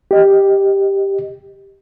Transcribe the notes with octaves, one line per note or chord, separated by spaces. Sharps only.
G4 D#5